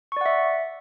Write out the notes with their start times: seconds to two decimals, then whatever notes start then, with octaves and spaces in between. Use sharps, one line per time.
0.12 C#6
0.17 D5
0.21 F#5
0.26 E5